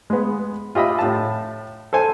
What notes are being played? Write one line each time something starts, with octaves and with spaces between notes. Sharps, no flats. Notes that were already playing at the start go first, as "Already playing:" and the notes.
G#3 B3
F4 G4 D#5 E5 B5
A2 A5
A4 C5 G#5